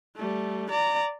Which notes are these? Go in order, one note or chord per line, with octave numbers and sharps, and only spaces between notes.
G3 A3
D5 A#5